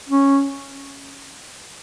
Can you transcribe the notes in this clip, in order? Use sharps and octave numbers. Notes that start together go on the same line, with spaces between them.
C#4